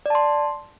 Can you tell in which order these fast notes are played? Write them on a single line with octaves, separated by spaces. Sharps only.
D5 A5 C6